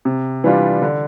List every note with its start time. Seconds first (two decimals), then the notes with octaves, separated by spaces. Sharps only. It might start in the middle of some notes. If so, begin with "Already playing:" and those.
0.05 C3
0.44 E3 G3 D4 F4
0.82 D3